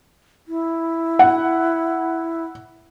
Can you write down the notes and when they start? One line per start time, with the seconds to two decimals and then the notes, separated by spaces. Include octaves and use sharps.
0.48 E4
1.19 F#5